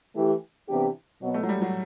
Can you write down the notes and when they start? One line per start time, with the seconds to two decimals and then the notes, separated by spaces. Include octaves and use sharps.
0.15 E3 A3 E4 G4
0.68 C3 E3 B3 D4 G4
1.21 B2 F#3 B3
1.34 A3
1.43 F#3
1.49 G3
1.62 F#3